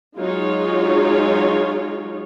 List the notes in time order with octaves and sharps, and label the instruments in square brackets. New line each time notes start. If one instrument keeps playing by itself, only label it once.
[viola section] F#3 G#3 D#4 F4 G#4 C#5